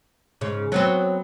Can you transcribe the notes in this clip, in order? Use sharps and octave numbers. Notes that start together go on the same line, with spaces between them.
G#2 C#3
F#3 B3 C4